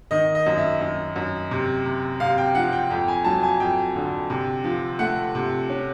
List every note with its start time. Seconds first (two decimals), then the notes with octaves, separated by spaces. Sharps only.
0.11 D#3 D#5
0.35 D#5
0.46 F#2
0.58 E5
0.81 F#2
1.16 F#2
1.51 C3
1.86 C3
2.20 C3 F5
2.38 G5
2.55 F3 F#5
2.72 G5
2.90 F2 G5
3.08 G#5
3.25 F#3 A5
3.43 G#5
3.60 F2 G5
3.95 D3
4.30 C3
4.64 F3
4.99 A3 F#5
5.35 C3
5.70 C#4